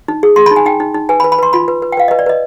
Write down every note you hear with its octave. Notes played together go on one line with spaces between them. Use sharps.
D#4
G#4
G#4 C6
B5
D#4
G#5
D#4 G5
D#4
D#4
B4 G#5
B5
B4
B5
B4 C6
F4 B5
B4
B4
G5
B4 F5
B4 D#5
D5
B4 D#5